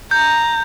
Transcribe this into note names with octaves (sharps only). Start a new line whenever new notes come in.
A#5 G6